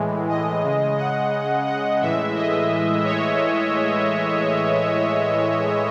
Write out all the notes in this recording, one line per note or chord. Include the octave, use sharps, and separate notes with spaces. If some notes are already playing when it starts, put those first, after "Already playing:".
Already playing: A2 E3 G#3
D#5
C#3 G#3
F#5
F#5
A2 E3 G#3 E5
D#5
C#5